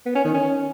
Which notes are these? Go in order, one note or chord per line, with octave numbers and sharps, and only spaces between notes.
B3
C#4
D#3
C#4